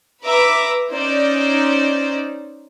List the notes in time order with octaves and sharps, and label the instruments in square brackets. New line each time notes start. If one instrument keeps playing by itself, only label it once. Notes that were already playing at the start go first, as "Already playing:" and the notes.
[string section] B4 E5 A#5 D6
C#4 D#4 C5 D5